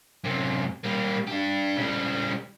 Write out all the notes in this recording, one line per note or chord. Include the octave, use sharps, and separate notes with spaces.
F#2 C3
G3 A#3
D4 G4
C#3 G3